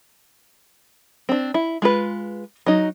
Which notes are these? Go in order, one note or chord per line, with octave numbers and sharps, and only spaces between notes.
C4 D4
E4
G#3 F4 B4
F#3 D#4